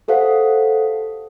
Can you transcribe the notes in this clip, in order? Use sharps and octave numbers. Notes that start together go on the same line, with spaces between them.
G4 A4 C5 F5 F#5